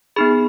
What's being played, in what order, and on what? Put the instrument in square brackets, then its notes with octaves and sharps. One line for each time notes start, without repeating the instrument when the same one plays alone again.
[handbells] B3 D#4 G#4 B5